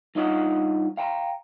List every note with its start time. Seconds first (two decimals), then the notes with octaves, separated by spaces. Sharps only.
0.15 G2 D#4 F4 C#5 D#5 F#5
0.97 F5 G5 A#5